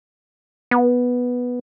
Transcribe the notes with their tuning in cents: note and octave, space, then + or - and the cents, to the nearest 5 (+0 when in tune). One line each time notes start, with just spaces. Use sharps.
B3 -5